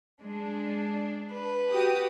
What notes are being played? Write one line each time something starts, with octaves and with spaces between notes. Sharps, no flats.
G#3 D4
B4
F#4 G4 D#6